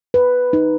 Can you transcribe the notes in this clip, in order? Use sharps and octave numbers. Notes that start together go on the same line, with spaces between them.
B4
D#4